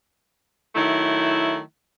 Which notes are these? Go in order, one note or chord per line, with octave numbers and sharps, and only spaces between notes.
D#3 F#3 A3 E4